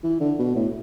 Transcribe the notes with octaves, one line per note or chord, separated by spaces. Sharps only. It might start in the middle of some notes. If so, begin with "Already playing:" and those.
E3
D3
B2
A2